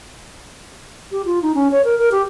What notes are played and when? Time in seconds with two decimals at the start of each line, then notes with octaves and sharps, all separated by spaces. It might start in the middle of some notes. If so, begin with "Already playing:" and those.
1.12 G4
1.25 F4
1.42 D#4
1.55 C#4
1.71 C#5
1.85 A#4
1.98 A#4
2.12 G4